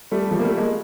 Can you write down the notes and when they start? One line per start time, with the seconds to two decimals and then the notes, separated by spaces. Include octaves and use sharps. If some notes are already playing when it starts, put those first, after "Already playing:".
0.12 G3 A3
0.31 F3 G3
0.39 A#3
0.44 G3 A3
0.57 G#3 A#3